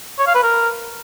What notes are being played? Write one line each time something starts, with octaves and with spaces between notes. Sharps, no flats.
C#5
F5
B4
A#4